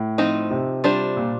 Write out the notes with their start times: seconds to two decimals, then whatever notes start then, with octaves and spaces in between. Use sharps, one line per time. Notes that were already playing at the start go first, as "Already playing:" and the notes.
Already playing: A2
0.18 F3 C4 D#4
0.51 C3
0.84 G3 D4 F4 C5
1.17 A#2